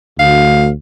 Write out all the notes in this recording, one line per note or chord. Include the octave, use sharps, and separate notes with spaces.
D2 F5